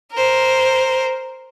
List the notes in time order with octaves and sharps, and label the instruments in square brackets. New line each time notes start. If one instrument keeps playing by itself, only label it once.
[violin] A#4 C5